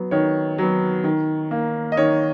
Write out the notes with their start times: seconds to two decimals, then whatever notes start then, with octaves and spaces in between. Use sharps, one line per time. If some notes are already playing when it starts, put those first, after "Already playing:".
Already playing: F#3 B3
0.11 D#3 C#5
0.58 F#3 B3
1.04 D#3
1.51 A#3
1.92 D#5
1.97 D#3 C#5